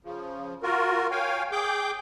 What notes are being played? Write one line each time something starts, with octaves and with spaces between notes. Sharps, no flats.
C#3 F3
F4 F#4 A#4
C#5 F5 G5 G#5
G#4 G5 D6 G6